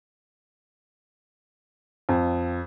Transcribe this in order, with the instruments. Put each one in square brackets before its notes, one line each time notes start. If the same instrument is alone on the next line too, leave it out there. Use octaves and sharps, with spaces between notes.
[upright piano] F2